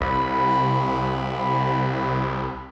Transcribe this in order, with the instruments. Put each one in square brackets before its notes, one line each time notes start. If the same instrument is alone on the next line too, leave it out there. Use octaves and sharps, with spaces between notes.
[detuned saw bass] C2 [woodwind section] B5